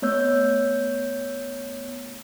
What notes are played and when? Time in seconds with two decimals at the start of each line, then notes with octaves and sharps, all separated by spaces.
0.02 A3 B3 C#5 E6 G6